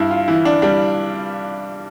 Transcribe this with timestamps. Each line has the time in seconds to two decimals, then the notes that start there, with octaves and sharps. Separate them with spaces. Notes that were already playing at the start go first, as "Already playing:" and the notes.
Already playing: G2 E4
0.11 F4
0.28 E3 E4
0.45 D4
0.62 G3 D4